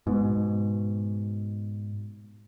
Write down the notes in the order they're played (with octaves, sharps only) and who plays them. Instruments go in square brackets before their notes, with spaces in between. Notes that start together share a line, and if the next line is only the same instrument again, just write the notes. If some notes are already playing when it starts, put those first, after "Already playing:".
[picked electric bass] G#2 B2